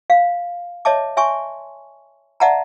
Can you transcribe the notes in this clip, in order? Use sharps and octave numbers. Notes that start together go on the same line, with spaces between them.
F5
C#5 D#5 E5 A5 D6
C#5 E5 G#5 C6 C#6
D5 E5 F#5 A5 A#5